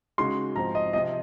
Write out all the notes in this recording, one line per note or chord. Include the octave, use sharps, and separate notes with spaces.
C#3 G#3 D#4 F#4 C6
G#2 F3 C4 A#5
D#5
C3 F3 C4 D#5